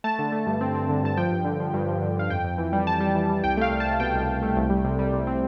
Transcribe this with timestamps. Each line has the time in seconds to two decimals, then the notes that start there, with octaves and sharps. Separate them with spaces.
0.04 A3 A5
0.19 D3
0.32 A3
0.46 G2
0.61 C4
0.75 C4
0.89 D3
1.03 G2 A5
1.17 F3 G5
1.32 G2
1.45 D3
1.60 F3
1.74 G2
1.88 F3
2.02 D3
2.16 G2 F5
2.30 F2 G5
2.44 F2
2.58 E3
2.73 G3
2.86 G3 A5
3.00 G3
3.15 E3
3.30 G3
3.43 C2 G5
3.57 A3 F5
3.71 C2
3.80 A5
3.85 C2
4.00 B2 G5
4.14 C2
4.28 C2
4.43 A3
4.56 C2
4.70 G3
4.85 C3
4.99 G3
5.13 C3
5.27 C4